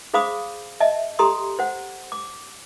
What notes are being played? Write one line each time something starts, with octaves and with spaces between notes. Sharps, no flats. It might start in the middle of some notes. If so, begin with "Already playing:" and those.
G#4 C5 F5 B5 D6 D#6
D#5 E5 A5
G4 A4 A#5 C6 D#6
C5 F#5
D6